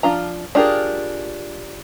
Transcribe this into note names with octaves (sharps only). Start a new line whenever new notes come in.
F3 D4 F4 A#5
D4 F4 G4 G#4 A#4